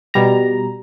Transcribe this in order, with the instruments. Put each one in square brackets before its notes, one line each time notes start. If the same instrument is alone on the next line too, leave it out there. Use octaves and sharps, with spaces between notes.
[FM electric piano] B2 G3 A#5